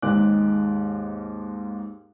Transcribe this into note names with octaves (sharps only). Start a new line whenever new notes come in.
D#2 G#2 G#3 D#4 D6 F#6